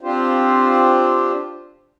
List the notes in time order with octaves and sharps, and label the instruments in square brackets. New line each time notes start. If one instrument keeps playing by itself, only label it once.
[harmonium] C4 D4 F4 G4 C5